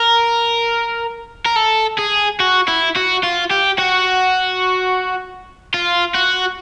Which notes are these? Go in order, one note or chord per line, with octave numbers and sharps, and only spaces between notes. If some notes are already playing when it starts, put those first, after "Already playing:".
Already playing: A#4
A#4
A4
G#4
F#4
E4
F#4
F4
G4
F#4
F4
F#4